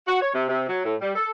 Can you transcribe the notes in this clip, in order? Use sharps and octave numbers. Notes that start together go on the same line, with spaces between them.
F#4
C#5
C3
C3
F#3
A2
G3
A4